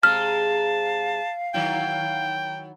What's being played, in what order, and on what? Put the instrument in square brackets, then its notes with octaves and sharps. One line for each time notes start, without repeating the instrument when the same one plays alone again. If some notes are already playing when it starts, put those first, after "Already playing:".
[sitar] C3 G#3 [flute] F5 [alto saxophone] A5 [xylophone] F6
[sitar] D#3 F#3 E4 [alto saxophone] G5